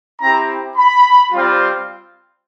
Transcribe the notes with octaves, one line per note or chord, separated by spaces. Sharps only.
C4 E4 G4 A#5
B5
G3 C4 F4